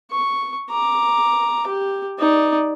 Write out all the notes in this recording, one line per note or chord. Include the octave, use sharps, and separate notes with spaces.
C#6
A#5 D6
G4
D#4 D5